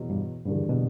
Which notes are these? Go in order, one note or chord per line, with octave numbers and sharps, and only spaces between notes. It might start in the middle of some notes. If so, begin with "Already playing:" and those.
Already playing: E2 B2 F#3
G2
F#1 E2 G2 D3 G3 A#3
B2